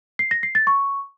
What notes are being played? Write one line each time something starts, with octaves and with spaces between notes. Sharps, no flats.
C7
A#6
C7
A6
C#6